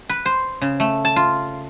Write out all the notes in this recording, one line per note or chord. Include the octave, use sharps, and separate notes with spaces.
B4
C5
C#3
A3
A5
F4